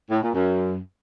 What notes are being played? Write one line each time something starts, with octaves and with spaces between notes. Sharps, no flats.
A2
A#2
F#2